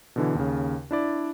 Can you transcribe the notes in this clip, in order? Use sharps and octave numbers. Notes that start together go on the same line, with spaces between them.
B2 D3 E3
D#2 C#3
D4 E4 D5